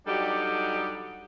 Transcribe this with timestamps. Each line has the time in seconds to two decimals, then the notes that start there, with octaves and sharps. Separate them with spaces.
0.07 F#3 G3 D4 D#4 G4 A4